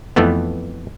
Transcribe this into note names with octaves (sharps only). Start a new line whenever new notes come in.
F2 E3 A3 B3